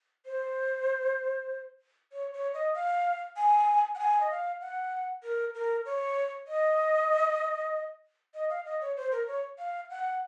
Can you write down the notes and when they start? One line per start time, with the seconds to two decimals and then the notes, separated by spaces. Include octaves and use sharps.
0.26 C5
2.12 C#5
2.33 C#5
2.54 D#5
2.75 F5
3.37 G#5
3.95 F#5
3.99 G#5
4.20 D#5
4.30 F5
4.61 F#5
5.23 A#4
5.54 A#4
5.85 C#5
6.48 D#5
8.34 D#5
8.50 F5
8.65 D#5
8.81 C#5
8.97 C5
9.12 A#4
9.27 C#5
9.58 F5
9.90 F#5